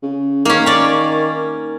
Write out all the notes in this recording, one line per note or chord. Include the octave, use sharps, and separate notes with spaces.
C#3
D#3 A#3 C#4
C#4 D5